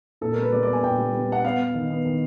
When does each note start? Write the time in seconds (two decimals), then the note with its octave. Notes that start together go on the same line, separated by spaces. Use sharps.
0.21 A#2 A4
0.32 A#4
0.37 G3
0.42 B4
0.52 G3 D5
0.63 D5
0.68 B3
0.73 G#5
0.83 A#2 G5
0.98 G3
1.14 G3
1.29 B3 F#5
1.44 B3 F5
1.60 B3
1.74 D#3
1.90 B3
2.05 D#3